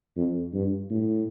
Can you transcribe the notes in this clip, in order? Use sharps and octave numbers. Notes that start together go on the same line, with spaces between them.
F2
G2
A2